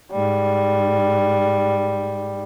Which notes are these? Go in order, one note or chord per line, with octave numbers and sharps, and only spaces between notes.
G#2 G3